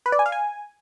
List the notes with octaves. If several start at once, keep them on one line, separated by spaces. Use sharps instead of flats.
B4
D5
G#5
F5
G#5